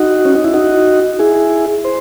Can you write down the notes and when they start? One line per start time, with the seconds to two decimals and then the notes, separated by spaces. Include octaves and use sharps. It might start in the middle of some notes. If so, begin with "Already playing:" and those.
Already playing: D#4 F#4
0.25 C#4
0.35 D#4
0.44 E4
0.53 D#4 F#4
1.19 E4 G#4
1.85 C5